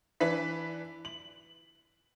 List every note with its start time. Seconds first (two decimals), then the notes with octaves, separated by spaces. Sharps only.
0.20 E3 D4 B4 B6
1.05 F#7